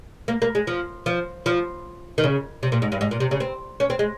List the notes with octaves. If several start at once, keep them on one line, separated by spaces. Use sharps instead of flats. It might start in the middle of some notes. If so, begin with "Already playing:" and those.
A#3
A#3
G#3
F3
F3
F3
D#3
C#3
C3
A#2
G#2
G2
G#2
A#2
C3
C#3
C4
C#4
C4
G#3